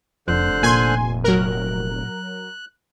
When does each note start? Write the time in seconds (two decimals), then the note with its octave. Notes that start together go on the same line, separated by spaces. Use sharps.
0.28 F1 F2 D3 C5 F#6
0.63 A#2 G#5 C6
1.24 F#3 A#4 F#6